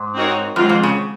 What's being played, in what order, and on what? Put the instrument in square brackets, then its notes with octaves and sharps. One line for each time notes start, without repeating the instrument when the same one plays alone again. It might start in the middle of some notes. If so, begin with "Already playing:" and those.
Already playing: [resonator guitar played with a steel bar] G#2
[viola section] C4 D#4 F#4 A#4 C#5
[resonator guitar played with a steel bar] F#2 [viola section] G#3 C4 F4
[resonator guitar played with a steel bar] F2
C#3